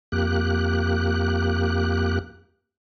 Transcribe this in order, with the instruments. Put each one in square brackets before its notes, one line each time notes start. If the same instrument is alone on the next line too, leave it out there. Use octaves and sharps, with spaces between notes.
[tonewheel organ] F2 A#3 G4 F#6